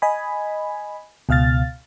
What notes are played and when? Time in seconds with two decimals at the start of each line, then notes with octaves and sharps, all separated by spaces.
0.02 D#5 G#5 B5
1.29 C#2 B2 F5 F6 A6